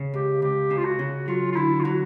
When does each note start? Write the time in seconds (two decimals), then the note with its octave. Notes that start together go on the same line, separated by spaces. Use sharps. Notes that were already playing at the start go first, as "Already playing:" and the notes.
Already playing: C#3
0.13 C#2 G4
0.42 C#2 G4
0.71 C#3
0.77 F4
0.85 F#4
0.99 C#3
1.28 F#3 F4
1.52 F4
1.56 D3 E4
1.80 F4
1.84 F#3 F#4